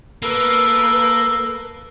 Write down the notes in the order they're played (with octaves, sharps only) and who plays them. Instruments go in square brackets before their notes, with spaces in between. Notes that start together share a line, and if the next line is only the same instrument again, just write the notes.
[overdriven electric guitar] A#3 [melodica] A4 [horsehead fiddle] B4